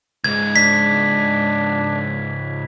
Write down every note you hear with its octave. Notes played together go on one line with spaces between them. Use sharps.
C#2 G#2 G#6
D4 B6